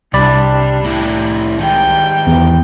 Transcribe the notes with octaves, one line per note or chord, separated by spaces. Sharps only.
C2 C3 G3 D4 D5 B5
A2 E4 G4
G#2 D#3 G3 G5
E2